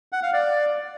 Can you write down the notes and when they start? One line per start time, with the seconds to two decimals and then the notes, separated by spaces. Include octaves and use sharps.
0.12 F#5
0.23 F5
0.33 D5